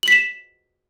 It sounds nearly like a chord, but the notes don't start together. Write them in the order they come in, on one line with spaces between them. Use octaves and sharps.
F#7 B6 E7